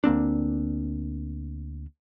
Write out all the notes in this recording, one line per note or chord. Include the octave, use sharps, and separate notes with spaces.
D2 A#3 C4 D4